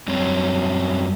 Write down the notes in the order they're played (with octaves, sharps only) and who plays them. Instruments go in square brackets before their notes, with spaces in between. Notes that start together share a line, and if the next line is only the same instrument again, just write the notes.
[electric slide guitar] F#2 F#3 G3 C4 C#5